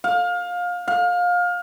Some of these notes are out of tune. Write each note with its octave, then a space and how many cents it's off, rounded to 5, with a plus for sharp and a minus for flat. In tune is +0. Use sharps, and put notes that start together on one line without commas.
F5 +25
F5 +25